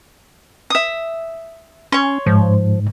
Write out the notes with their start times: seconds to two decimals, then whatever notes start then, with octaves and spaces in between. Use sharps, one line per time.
0.70 E5 D#6
1.92 C#4 C#5 C6
2.26 G#2 F3